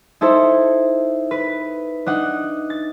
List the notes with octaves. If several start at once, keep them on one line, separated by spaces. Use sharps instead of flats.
D#4 E4 A4 C5
B4
D4 D#4 F#5
A6